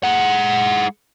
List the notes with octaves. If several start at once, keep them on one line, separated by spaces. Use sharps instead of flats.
G#3 F#5